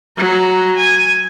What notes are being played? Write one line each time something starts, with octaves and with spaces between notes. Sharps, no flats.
F#3 A#5
G#5